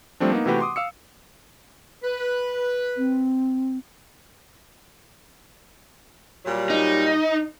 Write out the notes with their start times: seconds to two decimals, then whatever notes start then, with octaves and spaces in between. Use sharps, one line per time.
0.20 F3 G3 A3 C4 D4
0.32 A#3 B3 D#4
0.46 C3 E3 A3 F#4 G4 B4
0.59 F#5 C6 D6 D#6
0.76 F5 E6 C#7
2.03 B4
2.97 C4
6.45 A#2 F#3 G3
6.70 D#4